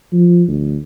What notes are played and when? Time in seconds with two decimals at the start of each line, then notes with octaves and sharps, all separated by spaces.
0.12 F3
0.48 D2